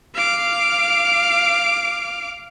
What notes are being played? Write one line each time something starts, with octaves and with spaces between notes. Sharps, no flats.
F5 D6